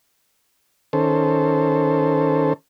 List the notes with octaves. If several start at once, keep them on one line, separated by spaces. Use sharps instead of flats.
D#3 C#4 A4 C5